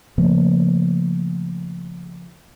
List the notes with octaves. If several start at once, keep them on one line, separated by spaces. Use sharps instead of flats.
C#3 F3 A3 A#3